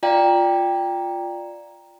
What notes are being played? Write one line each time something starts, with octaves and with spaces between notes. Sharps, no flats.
F4 D5 F5 G5 A#5